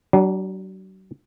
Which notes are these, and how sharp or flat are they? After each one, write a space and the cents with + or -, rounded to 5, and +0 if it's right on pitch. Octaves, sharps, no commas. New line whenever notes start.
F#3 +40 D4 +0